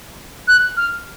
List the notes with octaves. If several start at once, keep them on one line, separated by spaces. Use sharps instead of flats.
F#6
F6